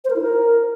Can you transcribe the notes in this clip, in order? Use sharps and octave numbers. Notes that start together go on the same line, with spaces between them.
C5
A#4
E4
A#4